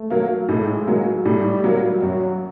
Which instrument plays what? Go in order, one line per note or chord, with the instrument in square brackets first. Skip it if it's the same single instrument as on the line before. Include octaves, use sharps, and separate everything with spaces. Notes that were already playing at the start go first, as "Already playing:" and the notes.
Already playing: [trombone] A3
[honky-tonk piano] F#3 A#3
[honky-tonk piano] A2 [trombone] G#3
[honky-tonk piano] F#3 A#3
[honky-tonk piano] A2 [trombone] G3
[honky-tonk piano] F#3 A#3
[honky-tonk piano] F#2 [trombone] F#3